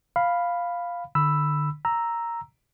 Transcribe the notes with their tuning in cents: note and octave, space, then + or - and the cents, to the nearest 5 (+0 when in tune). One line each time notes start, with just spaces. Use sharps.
F5 +0 B5 +0
D3 +25 B5 +0 E6 +5
A#5 +0 E6 +0